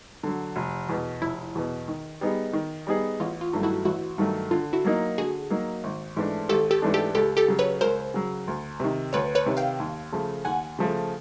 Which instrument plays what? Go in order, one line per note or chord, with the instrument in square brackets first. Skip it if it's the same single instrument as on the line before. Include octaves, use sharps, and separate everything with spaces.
[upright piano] D3 F#3
F1
E2 B2
[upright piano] F1 [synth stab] E4
[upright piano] E2 B2
D#3
G3 B3 D#4 G#4
D#3
G3 B3 D#4 G#4
[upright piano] A1 [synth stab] F4
[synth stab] F4
[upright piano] G2 D#3 F#3 A3
[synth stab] E4 F#4
[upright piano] A1 [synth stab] E4 F#4
[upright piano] G2 D#3 F#3 A3
[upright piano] D3 [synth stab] F4
[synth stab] E4 F#4
[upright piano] F#3 A#3 D#4
[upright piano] D3 [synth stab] F#4 G#4
[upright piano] F#3 A#3 D#4
G#1
G#2 E3 A3 D4
[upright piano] G#1 [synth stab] G4 A4
[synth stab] G4 A4
[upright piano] G#2 E3 A3 D4
[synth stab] G4 A4
[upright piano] C#2 [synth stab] G4 A4
[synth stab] G4 A4
[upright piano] C#3 F#3
[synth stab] B4 C#5
[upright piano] C#2 [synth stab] A#4 C5
[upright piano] C#3 F#3
D2
C3 D#3
[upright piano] D2 [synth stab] B4 C#5
[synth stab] B4 C#5
[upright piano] C3 D#3
[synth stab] F5 G5
[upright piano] D#2
C#3 F3 A3
[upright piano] D#2 [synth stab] F#5 G#5
[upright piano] C#3 F3 A3